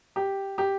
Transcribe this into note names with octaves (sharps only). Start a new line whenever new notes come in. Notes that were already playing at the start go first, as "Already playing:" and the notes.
G4
G4